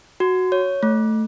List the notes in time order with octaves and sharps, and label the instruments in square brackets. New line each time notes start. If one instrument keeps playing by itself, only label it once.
[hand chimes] F#4
C#5
A3